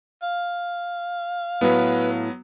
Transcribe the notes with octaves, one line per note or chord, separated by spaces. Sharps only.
F5
A2 F#3 B3 B4 C#5